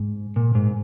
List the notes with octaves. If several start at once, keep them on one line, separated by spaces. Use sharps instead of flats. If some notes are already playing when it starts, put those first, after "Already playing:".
Already playing: G#2
A#2
G#2